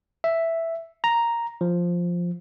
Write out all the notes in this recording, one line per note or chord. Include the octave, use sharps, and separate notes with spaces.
E5
A#5
F3